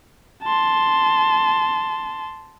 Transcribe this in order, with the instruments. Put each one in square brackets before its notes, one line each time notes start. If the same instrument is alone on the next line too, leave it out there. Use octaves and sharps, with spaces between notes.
[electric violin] A5 C6